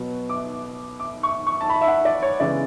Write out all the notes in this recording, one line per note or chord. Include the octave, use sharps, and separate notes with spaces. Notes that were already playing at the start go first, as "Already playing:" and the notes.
Already playing: B2 F#3 B3
D6
D6
C#6
C#6
A5
B5
E5
F#5
D5
C#5
C#3 E3 G#3 B3 D5